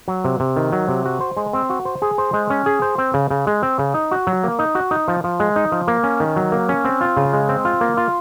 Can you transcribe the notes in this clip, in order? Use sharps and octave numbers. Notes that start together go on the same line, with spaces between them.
F#3
C3
C3
D#3
F#3
C3
F#4
C5
G#3
C4
F#4
C5
G#4
C5
G#3
C#4
G#4
C5
C4
C#3
C#3
G#3
C4
C#3
D#4
F#4
F#3
A#3
D#4
F#4
D#4
F3
F3
G#3
D#4
F3
A#3
C#4
D#3
F#3
A#3
C#4
C4
F4
C#3
G#3
C4
F4
A#3
F4